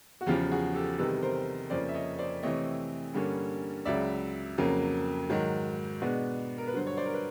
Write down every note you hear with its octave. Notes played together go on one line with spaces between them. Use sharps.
F#4
E2 C#3 F3 F4 G4
F#4 G#4
G4 A4
E2 C3 D#3 G3 A4 B4
A#4 C5
F2 C#3 F3 A#3 C#4 C5 D5
E5
C#5 D#5
C5 D5
C3 E3 A3 C4 C#5 D#5
G2 D3 G3 A#3 C#4
C#2 C#3 F#3 D5 E5
F2 C#3 F#3 A#3
G#2 D#3 F#3
B2 G#3 B3 D4
A#4
B4
G2 D3 F#3 C5
C#5
C5 D5
A#4
B4